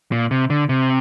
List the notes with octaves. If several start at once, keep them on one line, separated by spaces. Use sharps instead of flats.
A#2
C3
D3
C3